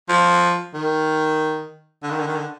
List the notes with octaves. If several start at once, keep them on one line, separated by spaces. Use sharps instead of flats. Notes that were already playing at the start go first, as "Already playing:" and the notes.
F3
D#3
D3
D#3
D3
D#3
D3